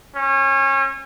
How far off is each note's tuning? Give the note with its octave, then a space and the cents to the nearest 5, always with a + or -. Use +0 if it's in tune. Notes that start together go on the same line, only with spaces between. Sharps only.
C#4 -30